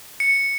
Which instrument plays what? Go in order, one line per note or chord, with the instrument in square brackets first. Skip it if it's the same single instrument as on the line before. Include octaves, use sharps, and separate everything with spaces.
[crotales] C#7